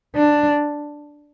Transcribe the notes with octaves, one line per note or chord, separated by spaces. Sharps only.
D4